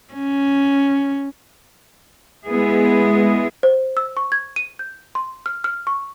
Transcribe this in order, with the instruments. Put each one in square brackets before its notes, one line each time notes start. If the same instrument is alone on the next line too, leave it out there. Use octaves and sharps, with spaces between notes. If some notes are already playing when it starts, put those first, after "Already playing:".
[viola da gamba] C#4
[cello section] G#3 B3 E4 G#4
[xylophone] C5
E6
C#6
G#6
D#7
G6
C6
F6
F6
C#6